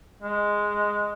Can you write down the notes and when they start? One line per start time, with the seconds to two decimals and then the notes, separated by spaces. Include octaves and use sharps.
0.22 G#3